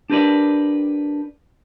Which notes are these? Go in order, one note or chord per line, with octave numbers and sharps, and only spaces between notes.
D4 G4 A#4 B4 D5